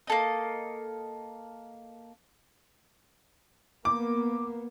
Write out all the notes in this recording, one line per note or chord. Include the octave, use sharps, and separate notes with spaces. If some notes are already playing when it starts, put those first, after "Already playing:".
A#3 A4 D#5
A#3 B3 D6